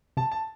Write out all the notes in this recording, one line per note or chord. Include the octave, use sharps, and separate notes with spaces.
C3 A5
A5